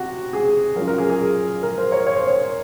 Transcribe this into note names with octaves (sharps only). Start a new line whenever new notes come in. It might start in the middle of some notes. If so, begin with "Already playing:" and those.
Already playing: C3 F#4
G#4
F#3 C#4 F4 A#4
A#4
G#4
G#4
A#4
C5
C#5
C#5
C5
C#5